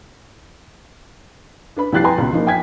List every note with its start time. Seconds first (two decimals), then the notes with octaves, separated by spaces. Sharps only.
1.76 D4 B4 B5
1.92 C2 F3 G4 F#6 A6 C7
2.04 B4 G5 G#5 A#5 C6
2.18 C#2 B2
2.33 F3 A#3 D#4
2.47 G5 G#5 G#6 B6